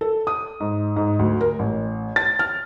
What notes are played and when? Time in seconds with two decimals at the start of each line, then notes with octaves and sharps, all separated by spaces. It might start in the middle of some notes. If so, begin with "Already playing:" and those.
0.01 A4
0.27 D#6
0.60 G#2
0.96 G#2
1.19 D2
1.41 A#4
1.59 A1
2.16 A6
2.39 F6